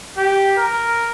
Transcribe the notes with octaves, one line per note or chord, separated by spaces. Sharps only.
G4
A#4